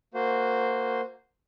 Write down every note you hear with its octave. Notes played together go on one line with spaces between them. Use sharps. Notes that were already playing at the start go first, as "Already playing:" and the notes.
A#3 F#4 C5